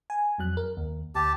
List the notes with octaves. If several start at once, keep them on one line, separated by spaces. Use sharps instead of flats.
G#5
F2 F#3 F#6
A#4
D#2
D2 G4 A5